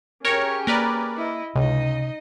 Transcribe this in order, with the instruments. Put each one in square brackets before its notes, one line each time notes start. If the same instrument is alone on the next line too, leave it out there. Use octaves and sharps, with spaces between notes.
[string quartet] C#4 G4 G#4 [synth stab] A#4 C#5
[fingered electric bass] A#3 [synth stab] A#4 B4 D5
[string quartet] E4 D#5
[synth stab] C#2 [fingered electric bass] C3 [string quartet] D#4 D#5